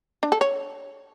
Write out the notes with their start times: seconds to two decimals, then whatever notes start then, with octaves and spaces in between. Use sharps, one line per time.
0.23 D4
0.32 A4
0.41 C#5